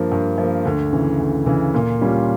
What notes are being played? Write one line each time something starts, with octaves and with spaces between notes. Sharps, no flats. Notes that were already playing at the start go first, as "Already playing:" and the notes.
Already playing: G2 F3 A#3
G2
F3
A#3
D2
C#3 E3
D2
C#3 E3
A#2
G3 C#4 F4